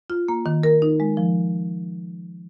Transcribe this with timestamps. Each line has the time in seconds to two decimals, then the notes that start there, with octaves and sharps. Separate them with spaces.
0.10 F4
0.28 A#3
0.46 D#3
0.63 A#4
0.82 D#4
1.00 G#3
1.17 F3